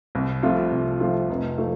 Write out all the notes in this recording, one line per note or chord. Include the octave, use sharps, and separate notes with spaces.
C2
C3 F3 A3 F4
C2
C3 F3 A3 F4
F1
F3 A3